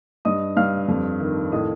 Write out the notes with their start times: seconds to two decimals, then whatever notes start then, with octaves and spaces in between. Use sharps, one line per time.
0.25 G2 D#5 D#6
0.57 G2 F5 F6
0.88 F2
1.20 D#3
1.52 A2 D#5 D#6